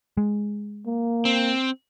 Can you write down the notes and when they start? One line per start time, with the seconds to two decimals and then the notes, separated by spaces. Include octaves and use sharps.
0.17 G#3
0.86 A#3
1.25 C4